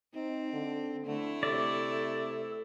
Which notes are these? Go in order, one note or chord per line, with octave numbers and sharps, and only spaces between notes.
C4 D#4
D3
D3 A3 E4
C3 A4 D5